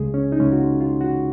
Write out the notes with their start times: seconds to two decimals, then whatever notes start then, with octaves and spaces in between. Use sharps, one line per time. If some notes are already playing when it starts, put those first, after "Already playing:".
Already playing: C#2 C#3 G#3 G#4
0.14 C#4
0.32 D#4
0.40 C#2 C#3 G#3 C#4
0.52 F#4
0.60 F4
0.81 F4
1.01 F#4